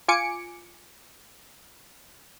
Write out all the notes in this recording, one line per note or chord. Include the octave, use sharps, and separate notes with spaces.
F4 G#5 D6 C#7 D7